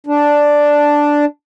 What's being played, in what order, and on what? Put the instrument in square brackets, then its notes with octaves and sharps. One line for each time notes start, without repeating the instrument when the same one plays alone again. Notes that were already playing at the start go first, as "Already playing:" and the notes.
[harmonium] D4